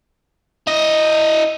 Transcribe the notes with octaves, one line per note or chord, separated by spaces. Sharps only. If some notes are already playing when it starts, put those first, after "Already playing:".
E4 D#5